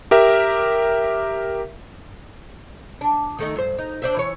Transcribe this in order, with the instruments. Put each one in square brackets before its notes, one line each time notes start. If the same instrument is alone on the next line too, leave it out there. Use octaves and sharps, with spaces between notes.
[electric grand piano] G4 A#4 E5
[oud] D4
D#3 A3 D#4
G2 C5
D#4
D4 C5 E5
E3 C#5